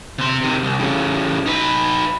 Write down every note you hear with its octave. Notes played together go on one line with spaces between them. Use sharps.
C3 C6
C3 D#3
C2
A2 C#3
D#4 B4